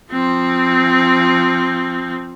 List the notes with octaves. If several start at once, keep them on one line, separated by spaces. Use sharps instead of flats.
F3 C4